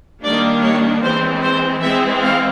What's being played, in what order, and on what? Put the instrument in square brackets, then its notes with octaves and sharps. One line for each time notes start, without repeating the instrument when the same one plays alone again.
[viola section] D#3 G3 A#3 D4 D5
C#5
E3 G#3 C4 C5
C5
E3 G#3 C4 E5
F5